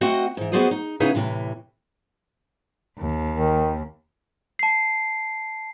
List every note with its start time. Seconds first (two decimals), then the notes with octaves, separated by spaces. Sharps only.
0.01 A3 C4 F#4 D#5 F#5
0.37 G#2 E3
0.52 B3 F#4 G#4 C5 D5 D#5
0.71 D#4
1.00 C#3 B3 D#4 E4 G#4 B4
1.15 A2 C3 E3
2.99 D#2
3.34 D#3
4.59 A5 C7